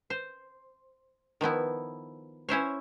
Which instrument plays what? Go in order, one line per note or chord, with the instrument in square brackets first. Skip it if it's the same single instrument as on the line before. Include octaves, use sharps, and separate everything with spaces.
[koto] C5
D#3 F3 B3 E4
C#4 E4 C5 C#5